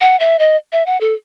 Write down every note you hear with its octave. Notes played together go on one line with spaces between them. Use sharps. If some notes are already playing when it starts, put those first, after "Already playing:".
F#5
E5
D#5
E5
F#5
A4